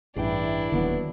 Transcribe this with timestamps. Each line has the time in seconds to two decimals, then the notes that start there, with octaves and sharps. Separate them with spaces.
0.16 A1 G2 E3 D4 E4 G#4 D5 G5
0.72 D#1 D#2 D3 D#3 F#3 B3